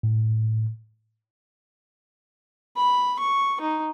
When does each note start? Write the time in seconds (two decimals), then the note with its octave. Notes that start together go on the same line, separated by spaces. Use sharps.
0.03 A2
2.77 B5
3.19 C#6
3.61 D#4